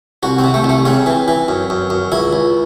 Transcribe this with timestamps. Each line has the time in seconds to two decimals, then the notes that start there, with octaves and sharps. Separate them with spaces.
0.23 C2 F#4
0.39 C4
0.44 C3
0.54 A3
0.64 C2
0.69 A3
0.85 C#3 C4
1.06 E3
1.28 E3
1.48 F#2
1.70 F#2
1.90 F#2
2.12 C#2 E4
2.33 C#2